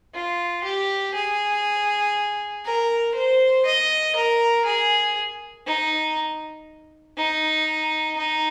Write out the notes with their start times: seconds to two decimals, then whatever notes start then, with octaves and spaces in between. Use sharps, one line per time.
0.14 F4
0.64 G4
1.14 G#4
2.65 A#4
3.15 C5
3.65 D#5
4.16 A#4
4.66 G#4
5.66 D#4
7.17 D#4
8.17 D#4